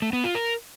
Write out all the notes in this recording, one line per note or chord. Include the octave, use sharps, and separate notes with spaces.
A3
B3
F4
A#4